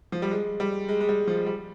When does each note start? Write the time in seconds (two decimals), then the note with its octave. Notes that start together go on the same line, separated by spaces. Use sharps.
0.12 F3
0.22 G3
0.31 G#3
0.60 G3
0.88 G#3
1.01 G#3
1.09 G3
1.28 F3
1.46 G3